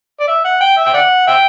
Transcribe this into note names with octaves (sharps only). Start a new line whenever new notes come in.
D5
E5
F#5
G5
E5
G5
D5 F#5
E5 G5